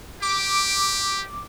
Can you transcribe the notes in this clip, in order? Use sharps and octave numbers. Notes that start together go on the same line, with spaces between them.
G4 D6